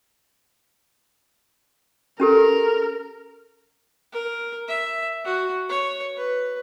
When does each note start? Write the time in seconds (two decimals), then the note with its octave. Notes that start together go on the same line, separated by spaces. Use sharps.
2.20 C#4 G4 A4 A#4
4.12 A#4
4.68 E5
5.25 F#4
5.69 C#5
6.17 B4